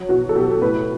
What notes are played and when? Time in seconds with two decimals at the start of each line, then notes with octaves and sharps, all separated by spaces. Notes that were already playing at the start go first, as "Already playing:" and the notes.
Already playing: F#3
0.09 B2 F#4
0.29 A4
0.36 B2 G4
0.62 A2 B4